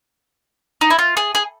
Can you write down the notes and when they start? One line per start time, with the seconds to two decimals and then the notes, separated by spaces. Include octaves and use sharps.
0.81 D#4
0.90 E4
0.99 F4
1.17 G#4
1.35 G#4